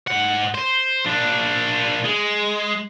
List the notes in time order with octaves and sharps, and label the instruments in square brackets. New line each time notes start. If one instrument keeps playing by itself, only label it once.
[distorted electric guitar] G#2 F#5
C5
A#2 D4
G#3